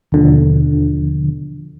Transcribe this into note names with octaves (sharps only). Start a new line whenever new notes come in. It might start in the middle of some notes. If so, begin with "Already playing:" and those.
D#2 B2 D3 F3